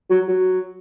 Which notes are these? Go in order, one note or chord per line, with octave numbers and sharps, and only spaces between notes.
F#3
F#3